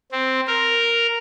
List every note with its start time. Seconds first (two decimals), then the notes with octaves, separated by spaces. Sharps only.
0.12 C4
0.47 A#4